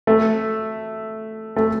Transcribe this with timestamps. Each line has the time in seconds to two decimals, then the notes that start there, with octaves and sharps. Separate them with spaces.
0.07 A3
1.56 A3